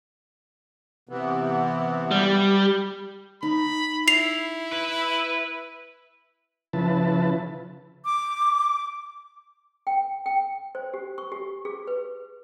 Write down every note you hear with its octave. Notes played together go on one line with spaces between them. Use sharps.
C3 E3 B3
G3
D#4 B5
E4 C7 F7
B4
C#3 F3 E4 B4 A5
D6
G5
G5
C5
G4
C#6
G4
G#4
B4